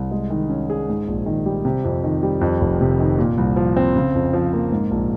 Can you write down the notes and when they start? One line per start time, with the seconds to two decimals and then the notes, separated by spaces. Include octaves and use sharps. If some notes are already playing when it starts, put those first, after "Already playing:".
Already playing: C2
0.11 G#3
0.30 D#3
0.50 C#4
0.70 G#4
0.89 G#2
1.08 A#1
1.26 D#3
1.46 G3
1.65 C3
1.84 F2
2.04 D#3
2.23 G3
2.41 F2
2.61 F1
2.81 C3
2.99 D#3
3.19 A#2
3.38 C2
3.56 F3
3.77 C4
3.96 C#3
4.15 F2
4.33 F3
4.53 A#3
4.72 G#2
4.91 A#1